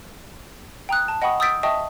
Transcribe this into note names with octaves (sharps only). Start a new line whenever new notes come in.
G5 A#5 D#6 F#6
A5
D#5 F#5 G5 B5 C#6 D#6
D#6 E6 G6 A6 B6 D7
D#5 E5 G5 A5 C#6 D#6